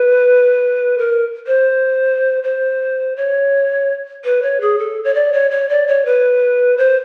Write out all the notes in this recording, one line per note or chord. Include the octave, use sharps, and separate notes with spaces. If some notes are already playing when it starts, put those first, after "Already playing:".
Already playing: B4
A#4
C5
C5
C#5
B4
C#5
G#4
A4
C#5
D5
C#5
C#5
D5
C#5
B4
C5